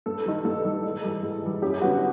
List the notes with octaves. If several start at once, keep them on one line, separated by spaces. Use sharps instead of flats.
G2 A4
D#3 G3
G2 A4
D#3 G3
G#2
E3 G3
G#2
E3 G3
F#2 G4
D3 G3 B3 F#4